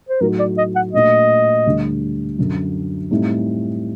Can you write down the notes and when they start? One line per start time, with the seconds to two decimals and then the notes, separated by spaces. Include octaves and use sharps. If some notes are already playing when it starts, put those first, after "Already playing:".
0.09 C5
0.20 A2 F#3 A3 D#4 F#4 A#4
0.39 D5
0.58 D#5
0.76 F#5
0.93 A#2 A3 D4 F#4 D#5
1.66 D2 D3 G3
2.39 F#2 D3 F#3
3.10 A2 G3 C4 D#4